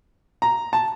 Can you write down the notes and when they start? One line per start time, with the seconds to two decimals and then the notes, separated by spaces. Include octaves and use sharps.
0.42 A#5
0.73 A5